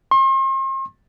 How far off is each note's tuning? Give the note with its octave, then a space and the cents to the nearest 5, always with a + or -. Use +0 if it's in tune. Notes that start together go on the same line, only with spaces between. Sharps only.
C6 +40